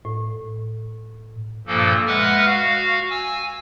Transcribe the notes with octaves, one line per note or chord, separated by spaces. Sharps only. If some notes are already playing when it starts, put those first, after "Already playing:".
A2
G2 A#2 F3 A#3 A4
G#3 B4 E5 F#5 F6
F#4 F5
G#5 E6